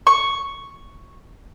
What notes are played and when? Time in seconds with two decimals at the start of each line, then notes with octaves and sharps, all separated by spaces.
0.07 C#6